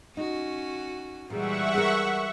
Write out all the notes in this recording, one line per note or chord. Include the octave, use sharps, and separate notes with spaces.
C#4 D#4 F#4
A#2 E3 G3 G#3 G#4 E5 F#5 C#6
G#4 A#4